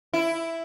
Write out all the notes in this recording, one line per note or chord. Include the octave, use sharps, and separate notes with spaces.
E4